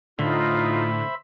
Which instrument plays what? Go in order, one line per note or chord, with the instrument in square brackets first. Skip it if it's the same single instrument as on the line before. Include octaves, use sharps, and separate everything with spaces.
[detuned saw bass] A2 [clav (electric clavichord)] D3 [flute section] D#4 F4 [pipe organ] C5 E5 B5